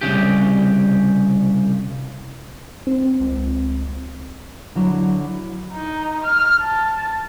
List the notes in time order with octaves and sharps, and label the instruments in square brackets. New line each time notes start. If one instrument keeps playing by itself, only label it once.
[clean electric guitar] C2 G#2 C#3 G4
[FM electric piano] C4
[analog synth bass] C#2
[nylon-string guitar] D3 F#3 E4
[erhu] D#4
F6
A5